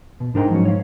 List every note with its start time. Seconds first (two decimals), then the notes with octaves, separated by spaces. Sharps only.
0.20 B2
0.35 G#2 D4 A#4 G5
0.50 F3 F#3 C#4
0.65 C#5 F5